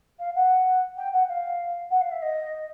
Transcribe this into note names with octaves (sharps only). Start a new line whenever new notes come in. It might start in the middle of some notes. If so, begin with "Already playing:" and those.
F5
F#5
G5
F#5
F5
F#5
F5
E5
D#5